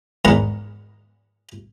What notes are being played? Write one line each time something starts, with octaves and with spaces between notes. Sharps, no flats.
E2 G#2 A#4 F#5 B5